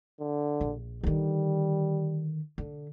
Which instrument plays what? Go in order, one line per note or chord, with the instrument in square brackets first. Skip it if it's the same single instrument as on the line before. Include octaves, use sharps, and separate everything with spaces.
[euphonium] D3
[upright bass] A#1
[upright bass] D3 D#3 [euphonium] G3
[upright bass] D3